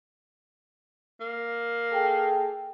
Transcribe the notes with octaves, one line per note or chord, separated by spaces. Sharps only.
A#3
G#4 A4 G5